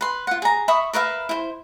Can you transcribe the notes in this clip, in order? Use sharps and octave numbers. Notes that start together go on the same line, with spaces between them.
B4 C6
F4 F#5
G#4 A#5
E5 B5 C#6 D#6
A#4 B4 E5 F5
E4 C5